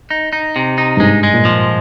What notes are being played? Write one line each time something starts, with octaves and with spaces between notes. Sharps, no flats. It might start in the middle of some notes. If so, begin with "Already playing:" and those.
D#4
D#4
C3
D#4
G2
G#2 G#3
G#3
A#2
F3